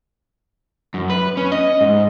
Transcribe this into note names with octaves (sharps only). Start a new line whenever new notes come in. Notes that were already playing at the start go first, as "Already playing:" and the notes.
F#2
B4
C#4
D#5
G#2